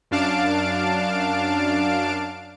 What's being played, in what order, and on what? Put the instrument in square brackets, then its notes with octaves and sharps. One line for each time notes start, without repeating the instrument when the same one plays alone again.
[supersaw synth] F#2 D4 F5 A5 D7